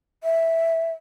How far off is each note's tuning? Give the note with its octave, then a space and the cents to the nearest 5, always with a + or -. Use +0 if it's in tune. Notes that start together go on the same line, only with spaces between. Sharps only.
E5 -5